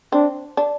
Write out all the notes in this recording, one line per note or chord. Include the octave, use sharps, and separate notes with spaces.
C4 D4
D4